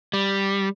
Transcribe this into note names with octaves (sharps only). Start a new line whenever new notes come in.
G3